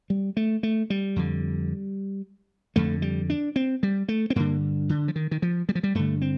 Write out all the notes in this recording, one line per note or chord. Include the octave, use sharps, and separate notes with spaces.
G3
A3
A3
G3
F2 D3
F2 D3 A3
G3
D4
C4
G3
A3
C4
G2 D3 A#3
D3
F3
D#3
D#3
F3
G3
F3
G3
G2 D3 A3
C4